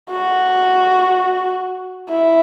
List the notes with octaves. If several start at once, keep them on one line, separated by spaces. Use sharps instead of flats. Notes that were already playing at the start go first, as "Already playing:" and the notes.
F#4
E4